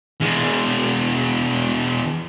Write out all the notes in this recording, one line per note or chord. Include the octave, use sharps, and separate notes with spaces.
E2 G#3